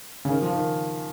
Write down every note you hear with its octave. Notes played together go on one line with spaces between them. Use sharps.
C#3
D#3
F3
D#3